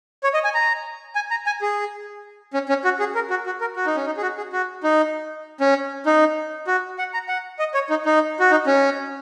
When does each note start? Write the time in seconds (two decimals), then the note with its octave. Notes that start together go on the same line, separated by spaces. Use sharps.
0.23 C#5
0.34 D#5
0.44 G#5
0.54 A#5
1.15 G#5
1.31 A#5
1.46 G#5
1.62 G#4
2.54 C#4
2.69 C#4
2.84 F#4
3.00 G#4
3.15 A#4
3.30 F#4
3.46 F#4
3.61 A#4
3.76 F#4
3.86 D#4
3.96 C#4
4.06 D#4
4.17 G#4
4.22 F#4
4.37 G#4
4.53 F#4
4.83 D#4
5.60 C#4
6.06 D#4
6.67 F#4
6.99 F#5
7.14 A#5
7.28 F#5
7.59 D#5
7.74 C#5
7.90 D#4
8.06 D#4
8.40 F#4
8.51 D#4
8.67 C#4